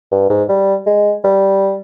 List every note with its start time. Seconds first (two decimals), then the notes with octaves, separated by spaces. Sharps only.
0.12 G2
0.30 G#2
0.49 G3
0.86 G#3
1.24 G3